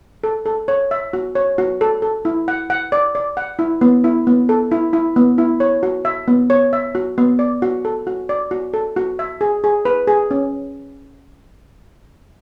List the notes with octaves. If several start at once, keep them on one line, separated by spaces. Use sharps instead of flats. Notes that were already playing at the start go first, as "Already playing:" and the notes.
A4
A4
C#5
E5
F#4
C#5
F#4
A4
A4
E4
F#5
F#5
D5
D5
F#5
E4
B3
E4
B3
A4
E4
E4
B3
E4
C#5
F#4
E5
B3
C#5
E5
F#4
B3
D5
F#4
A4
F#4
D5
F#4
A4
F#4
E5
G#4
G#4
B4
G#4
C#4